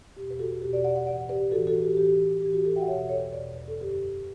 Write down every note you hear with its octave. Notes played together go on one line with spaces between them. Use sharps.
E2 B2 G4
B4
F#4 A4
E2 B2 G4 B4
B4 D5
D5 F#5
D5 F#5
A2 E3 D5 F#5
G4 B4
A2 E3 F#4 A4
F#4 A4
G4
A2 E3 G4
A2 E3 G4
F#4
G4
F#4 A4
E5 G5
F#5
E2 B2 C#5 E5
A4 C#5
B4
C#5
E2 B2 B4 D5
B4
A4
F#2 D3 G4 B4